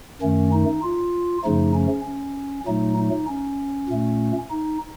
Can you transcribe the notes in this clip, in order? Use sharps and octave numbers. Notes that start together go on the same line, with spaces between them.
F#2 D#3 A3 C#4
D#4
F4
F#2 C#3 F3 A3 D#4
C#4
C#4
A#2 F#3 A3 D#4
D#4
C#4
A#2 A3
D#4